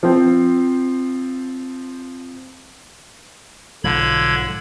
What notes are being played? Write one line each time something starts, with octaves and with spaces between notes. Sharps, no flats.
F3 C4
B1 G#2 D3 F3 B5 G#6